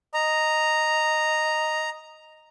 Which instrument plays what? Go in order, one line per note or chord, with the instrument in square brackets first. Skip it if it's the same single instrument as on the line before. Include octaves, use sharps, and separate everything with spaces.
[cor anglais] D#5 [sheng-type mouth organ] A#5